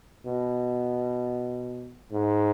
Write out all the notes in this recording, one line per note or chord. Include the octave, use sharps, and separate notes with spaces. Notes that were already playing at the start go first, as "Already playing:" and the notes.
B2
G#2